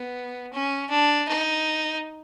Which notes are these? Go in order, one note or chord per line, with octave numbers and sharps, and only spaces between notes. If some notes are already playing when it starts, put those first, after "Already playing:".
Already playing: B3
C#4
D4
D#4